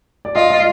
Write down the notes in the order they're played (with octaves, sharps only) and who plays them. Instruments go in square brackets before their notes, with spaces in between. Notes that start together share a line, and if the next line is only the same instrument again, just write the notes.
[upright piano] D5
[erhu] F4 [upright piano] D#5
[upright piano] D#5